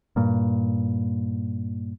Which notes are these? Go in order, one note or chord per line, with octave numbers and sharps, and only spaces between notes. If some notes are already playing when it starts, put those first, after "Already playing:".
G2 A#2